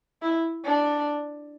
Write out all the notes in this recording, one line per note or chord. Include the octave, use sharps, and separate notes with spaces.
E4
D4